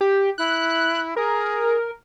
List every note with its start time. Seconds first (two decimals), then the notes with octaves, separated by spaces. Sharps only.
0.01 G4
0.38 E4 F#6
1.16 G#4 A#4